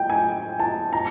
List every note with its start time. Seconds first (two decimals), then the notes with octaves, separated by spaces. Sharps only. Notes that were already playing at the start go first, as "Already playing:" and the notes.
Already playing: G5
0.10 G#5
0.60 A5
0.93 A#5